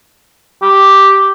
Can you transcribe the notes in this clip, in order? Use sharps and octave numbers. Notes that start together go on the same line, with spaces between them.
G4